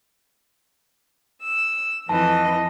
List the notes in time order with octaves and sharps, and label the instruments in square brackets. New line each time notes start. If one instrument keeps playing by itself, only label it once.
[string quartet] E6
[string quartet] F2 E3 D#5 [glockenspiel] A5